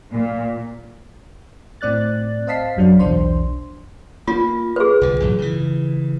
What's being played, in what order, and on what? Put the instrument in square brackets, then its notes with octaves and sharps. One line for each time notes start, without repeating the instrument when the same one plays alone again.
[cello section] A#2
[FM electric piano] A2 C4 D5 F#6 A6
C5 D#5 F5 A5 B6 C7
G#1 F#2 F#3 D4 F5
B1 E2 D4 C5 C6
[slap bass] A#3 [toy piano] F4
[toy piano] G#4 B4
[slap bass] C2 D3
A1 F#2 B2
C#3 E3